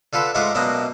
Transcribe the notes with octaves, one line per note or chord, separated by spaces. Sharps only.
D3 F4 A4 B4
G#2 G#3 A3 F4 F#5 D6
F#2 B2 A#3 D4 D#6